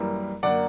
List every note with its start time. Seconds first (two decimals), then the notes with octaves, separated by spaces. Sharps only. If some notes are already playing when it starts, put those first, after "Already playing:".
Already playing: F#2 E3 G3 A#3
0.43 F#2 D3 A#3 D5 F#5